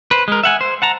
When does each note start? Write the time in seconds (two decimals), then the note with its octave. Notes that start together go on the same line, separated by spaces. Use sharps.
0.11 B4 C5
0.28 G#3 A#4
0.43 E5 F#5 G#5
0.61 C5
0.82 F#5 A5 A#5